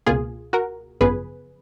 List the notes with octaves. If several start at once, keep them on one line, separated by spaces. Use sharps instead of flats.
C#2 B2 A#3 F4 G#4
F#4 A#4
G#1 F#2 C#3 F3 B3 G#4 B4